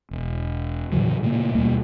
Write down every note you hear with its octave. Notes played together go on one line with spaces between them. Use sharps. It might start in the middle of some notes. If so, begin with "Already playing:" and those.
E1
A2 C#3 E3 F#3
A#2 C#3 A3 A#3
D#2 B2 G3 A#3